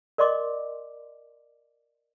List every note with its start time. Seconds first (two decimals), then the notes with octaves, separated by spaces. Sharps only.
0.18 A#4 D5 D#5 C6 D6